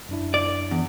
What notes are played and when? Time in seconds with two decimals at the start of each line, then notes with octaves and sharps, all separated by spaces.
0.09 F#2 D4 E4
0.34 D5
0.71 E2